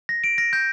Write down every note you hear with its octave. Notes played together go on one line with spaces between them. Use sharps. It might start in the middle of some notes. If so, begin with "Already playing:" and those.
A#6
D7
A#6
G6